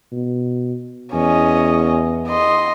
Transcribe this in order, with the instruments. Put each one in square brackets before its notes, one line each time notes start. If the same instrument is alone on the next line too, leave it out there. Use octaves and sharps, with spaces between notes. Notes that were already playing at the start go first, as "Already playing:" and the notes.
[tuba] B2
[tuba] E2 [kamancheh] C#4 D#5
[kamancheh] D#5 C6